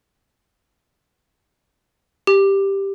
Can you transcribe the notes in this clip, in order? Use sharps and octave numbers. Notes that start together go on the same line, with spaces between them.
G4